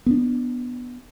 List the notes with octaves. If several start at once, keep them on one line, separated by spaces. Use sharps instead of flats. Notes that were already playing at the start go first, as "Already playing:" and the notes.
B3 D4